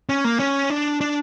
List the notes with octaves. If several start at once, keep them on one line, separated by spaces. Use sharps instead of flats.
C#4
A#3
C#4
D4
D4